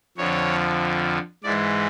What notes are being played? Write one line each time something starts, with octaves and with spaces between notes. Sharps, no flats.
F2 D3 F3 C#5
G#2 E3 G#3 D5